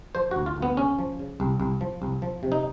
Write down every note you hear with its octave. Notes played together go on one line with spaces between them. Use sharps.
F3 C5
D2 F#4
F4
D2
B3
C#3 C#4
F3
C#3
C2
C2
F3
C2
F3
C3
D#4